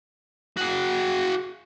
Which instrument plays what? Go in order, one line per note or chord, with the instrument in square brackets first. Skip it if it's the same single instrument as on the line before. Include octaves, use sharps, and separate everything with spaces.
[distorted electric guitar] F#4 G#4